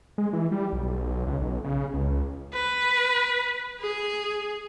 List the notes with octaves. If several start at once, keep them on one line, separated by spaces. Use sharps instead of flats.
G#3
E3
G3
B1
C#2
B1
C#3
C#2
B4
G#4